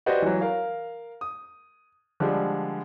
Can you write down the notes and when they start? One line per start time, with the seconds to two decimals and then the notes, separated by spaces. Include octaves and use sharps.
0.06 F#4 G4 B4 C5 D5 D#5
0.22 E3 F#3
0.41 A#4 F5
1.21 D#6
2.20 D3 F3 G3 G#3